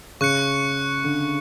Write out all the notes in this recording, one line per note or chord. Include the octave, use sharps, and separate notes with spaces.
C#3 C#6 F#6 C#7
D3